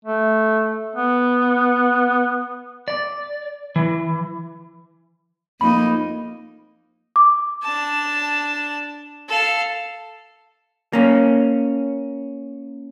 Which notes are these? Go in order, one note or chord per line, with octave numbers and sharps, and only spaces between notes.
A3
B3
D5
E3
F2 A#3 D#4 B5
D6
D4 A5
A4 F5
A#3 C#4